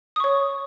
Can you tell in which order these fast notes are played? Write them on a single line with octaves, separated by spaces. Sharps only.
D#6 C#6 C#5